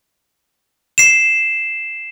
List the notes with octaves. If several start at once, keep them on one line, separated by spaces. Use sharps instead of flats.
C7 E7